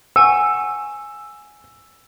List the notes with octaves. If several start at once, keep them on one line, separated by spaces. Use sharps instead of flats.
F#5 G#5 C#6 E6